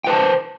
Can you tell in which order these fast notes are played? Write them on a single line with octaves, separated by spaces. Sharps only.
G5 B4 A5 C5